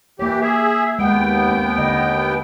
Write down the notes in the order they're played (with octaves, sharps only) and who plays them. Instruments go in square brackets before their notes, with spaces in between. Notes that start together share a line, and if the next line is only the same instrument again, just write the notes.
[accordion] E3 G4 [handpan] A#3 C#5
[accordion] G#4 E5
[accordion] D#2 B3 G5 [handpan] G#3 F#5
[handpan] A#3 C4
D3 D#5